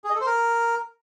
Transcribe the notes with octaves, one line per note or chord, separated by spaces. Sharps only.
G#4
D#5
A4
C5
A#4